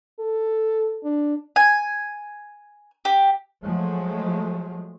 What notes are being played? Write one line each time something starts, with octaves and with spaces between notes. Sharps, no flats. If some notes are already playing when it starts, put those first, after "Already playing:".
A4
D4
G#5
G4
F3 F#3 G#3 A3